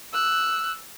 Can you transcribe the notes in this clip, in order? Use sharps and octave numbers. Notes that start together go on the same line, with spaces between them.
E6 F#6